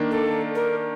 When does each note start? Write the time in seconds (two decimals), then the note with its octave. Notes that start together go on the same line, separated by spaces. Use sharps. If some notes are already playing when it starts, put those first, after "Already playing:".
Already playing: D#3 A#3 D4
0.11 A4
0.55 A#4